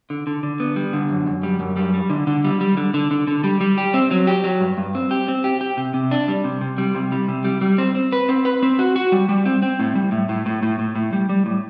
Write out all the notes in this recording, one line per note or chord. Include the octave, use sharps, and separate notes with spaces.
D3
D3
D3
B3
G3
D3
F#2
F#2
G3
F#2
G3
G3
D3
D3
G3
G3
D3
D3
D3
D3
G3
G3
G4
C4
F#3
G4
F#3
G2
G2
C4
G4
C4
G4
G4
C3
C3
D4
G3
C3
C3
G3
C3
G3
C3
G3
G3
C4
C4
B4
C4
B4
C4
F#4
F#4
G3
G3
C4
C4
A2
G3
A2
A2
A2
A2
A2
A2
G3
G3
A2